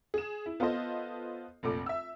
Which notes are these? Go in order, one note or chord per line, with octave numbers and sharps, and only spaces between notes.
G#4 E7
E4
B3 F4 A4 C5 D#5
F1 A#1 A3 D6
E5 E6